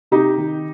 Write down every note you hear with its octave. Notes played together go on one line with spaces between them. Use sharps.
C3 D#4 G4
D#3